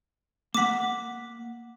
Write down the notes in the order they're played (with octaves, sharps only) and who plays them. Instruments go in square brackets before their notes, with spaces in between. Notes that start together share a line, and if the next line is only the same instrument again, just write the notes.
[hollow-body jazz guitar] A#3 F#5 [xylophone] D6 B6